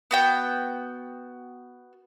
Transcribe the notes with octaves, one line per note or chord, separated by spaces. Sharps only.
B3 F#4 G5